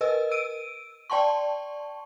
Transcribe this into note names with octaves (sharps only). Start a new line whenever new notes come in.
A#4 B4 D#5 E6
E6 D7 D#7
D5 G5 A5 C6 C#6